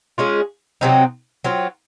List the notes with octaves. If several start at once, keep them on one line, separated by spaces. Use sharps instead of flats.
G#3 C#4 F4 G#4
C3 F#3 C4 D#4
F#3 C4 F4